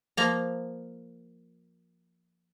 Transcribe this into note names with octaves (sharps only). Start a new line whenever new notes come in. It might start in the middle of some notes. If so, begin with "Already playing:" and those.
F3 A#3 A#5